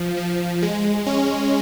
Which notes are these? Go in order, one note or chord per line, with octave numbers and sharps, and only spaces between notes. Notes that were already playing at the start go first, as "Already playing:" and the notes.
Already playing: F3
F3
G#3
C#4